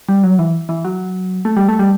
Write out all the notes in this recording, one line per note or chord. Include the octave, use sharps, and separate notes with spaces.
G3
F#3
E3
E3
F#3
A3
G3
A3
G3